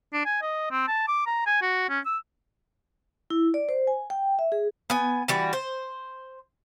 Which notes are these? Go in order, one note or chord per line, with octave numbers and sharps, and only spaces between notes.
D4
G#5
D#5
C4
A5
D6
A#5
G#5
F#4
C#4
E6
E4
D5
C5
G#5
G5
E5
G#4
B3 G#5
E3 G3 F#4
C5